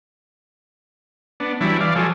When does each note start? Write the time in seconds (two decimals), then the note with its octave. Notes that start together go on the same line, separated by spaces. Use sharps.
1.40 B3 D4
1.61 E3 F#3 G3 D4 E4
1.81 E3 D5 F5
1.96 F3 F#3 G#4 A4